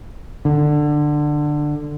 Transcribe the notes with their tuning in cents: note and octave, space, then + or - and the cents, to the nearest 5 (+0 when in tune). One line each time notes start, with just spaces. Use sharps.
D3 +15